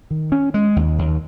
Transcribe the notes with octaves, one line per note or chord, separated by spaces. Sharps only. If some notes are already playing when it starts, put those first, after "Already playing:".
D#3
C#4
G#3
D#2
D#2